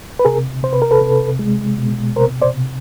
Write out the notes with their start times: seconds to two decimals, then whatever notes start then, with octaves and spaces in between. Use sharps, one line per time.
0.19 B4
0.25 C3 G#4 A#4
0.63 C3 C5
0.73 B4
0.82 A#4
0.91 A4 B4
1.01 C3
1.39 G#3
1.78 B2
2.16 C3 A#4 C5
2.42 C5 D5
2.54 C3